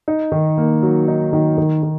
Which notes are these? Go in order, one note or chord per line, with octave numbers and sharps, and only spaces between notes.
D#4
D#3
A#3
F#3
D#4
D#3
D#3
D#3